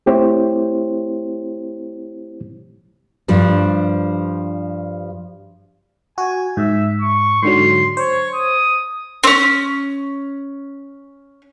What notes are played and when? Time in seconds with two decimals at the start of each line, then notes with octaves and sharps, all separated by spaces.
0.06 A3 C4 E4 G4 C5 C#5
3.28 G2 F3 G3 D4
6.18 F#4 G#5
6.57 G#2 E5
7.01 C#6
7.43 G#2 D3 F#3 C6
7.97 C5 C#5
8.34 D#6
9.24 C4 C#4